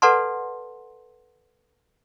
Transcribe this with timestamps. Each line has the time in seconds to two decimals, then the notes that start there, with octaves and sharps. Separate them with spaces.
0.02 A4 B4 D5 F#5 A5 C6